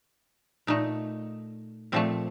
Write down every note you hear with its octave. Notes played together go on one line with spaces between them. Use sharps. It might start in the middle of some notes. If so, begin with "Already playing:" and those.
A#2 A3 D#4
A#2 F3 A3 C4